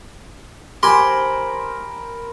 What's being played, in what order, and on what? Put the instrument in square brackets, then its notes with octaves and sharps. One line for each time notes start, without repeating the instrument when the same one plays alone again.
[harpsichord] G4 G#5 [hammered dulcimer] A#4 C5 [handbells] B5 [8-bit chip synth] C6